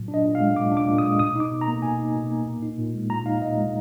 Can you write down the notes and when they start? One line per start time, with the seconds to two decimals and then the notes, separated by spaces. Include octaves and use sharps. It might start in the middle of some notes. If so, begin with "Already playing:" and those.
Already playing: A#2 F#3
0.08 D4
0.14 D#5
0.25 A#2
0.35 F5
0.41 G#3
0.56 A#2 D6
0.72 D4
0.77 D6
0.88 A#2
0.98 D#6
1.03 G#3
1.19 B2 D#6
1.36 D#4 D6
1.51 B2
1.61 A#5
1.67 A#3
1.82 B2 G#5
1.99 D#4
2.15 B2
2.31 A#3
2.46 A#2
2.62 D#4
2.78 A#2
2.94 G#3
3.10 A#2 A#5
3.26 D#4 F5
3.42 A#2 D#5
3.58 G#3